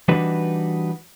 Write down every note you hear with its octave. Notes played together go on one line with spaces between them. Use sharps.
E3 G3 D4 D#4 F#4 B4